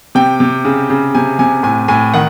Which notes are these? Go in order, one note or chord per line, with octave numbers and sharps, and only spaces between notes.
C3 G5
C3
C#3
C#3
C3 G#5
C3 G#5
A2 G#5
A2 G#5
D#3 F#5